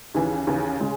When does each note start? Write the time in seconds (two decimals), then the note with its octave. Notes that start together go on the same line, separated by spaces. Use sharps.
0.14 D#2 C#3 E3
0.47 D#2 C#3 E3
0.80 C#3 G#3